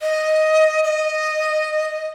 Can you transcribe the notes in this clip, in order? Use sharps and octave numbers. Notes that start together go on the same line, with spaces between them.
D#5
D#5